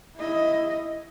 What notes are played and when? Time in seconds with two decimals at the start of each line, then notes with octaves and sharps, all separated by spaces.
0.17 E4 D#5